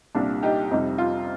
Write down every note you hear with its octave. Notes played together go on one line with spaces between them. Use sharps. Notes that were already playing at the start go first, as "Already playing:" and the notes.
C2 A#2 G3 D4
D#4 G4
F2 C3 G3 D#4
F4